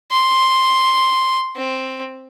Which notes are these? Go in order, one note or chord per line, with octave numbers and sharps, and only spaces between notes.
C6
C4